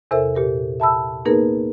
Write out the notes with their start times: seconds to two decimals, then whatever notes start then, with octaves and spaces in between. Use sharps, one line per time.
0.11 E2 C3 A4 A#4 C5 E5
0.35 A#2 G4 A#4
0.80 E5 A5 B5 E6
1.25 A#3 B3 D#4 G#4 A#4 B4